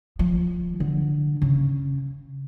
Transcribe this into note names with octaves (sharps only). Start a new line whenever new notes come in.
F3
D3
C#3